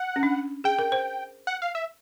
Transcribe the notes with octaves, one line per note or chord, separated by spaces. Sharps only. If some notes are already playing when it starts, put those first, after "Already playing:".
Already playing: F#5
C#4
D4
G#4 G5
A#4
C5
F#5
F5
E5